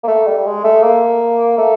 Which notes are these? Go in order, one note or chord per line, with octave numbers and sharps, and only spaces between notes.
A#3
A3
G3
G#3
A3
A#3
A3